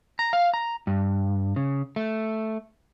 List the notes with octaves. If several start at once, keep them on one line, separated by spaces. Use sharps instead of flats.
A#5
F5
A#5
G2
C#3
A3